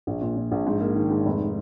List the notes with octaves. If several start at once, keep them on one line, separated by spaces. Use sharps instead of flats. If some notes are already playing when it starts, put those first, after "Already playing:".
A#1
A#2
A#2
A#1
G#2
A#3
D#3
G#2
F1